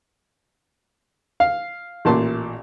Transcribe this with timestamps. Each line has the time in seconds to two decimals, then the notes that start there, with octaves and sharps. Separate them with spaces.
1.40 F5
2.05 A1 A#2 A5 C6